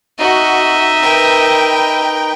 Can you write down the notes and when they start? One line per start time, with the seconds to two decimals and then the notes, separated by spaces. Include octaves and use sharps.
0.19 D#4 F#4 D#5 E5
1.02 A#4 B4 G5